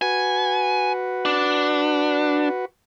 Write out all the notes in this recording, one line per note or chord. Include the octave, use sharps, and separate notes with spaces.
F#4 B4 G#5
D4